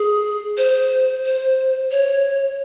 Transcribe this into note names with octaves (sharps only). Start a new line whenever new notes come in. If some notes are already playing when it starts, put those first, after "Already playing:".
Already playing: G#4
C5
C5
C#5